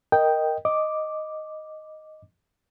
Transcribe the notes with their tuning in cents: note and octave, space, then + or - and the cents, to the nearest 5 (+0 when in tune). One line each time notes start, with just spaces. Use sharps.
A#4 +0 D#5 +0 G5 +0
D#5 +0 D6 +0